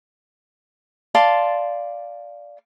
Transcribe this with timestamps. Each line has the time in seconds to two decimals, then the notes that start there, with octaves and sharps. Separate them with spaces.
1.15 D5 F5 A5 C6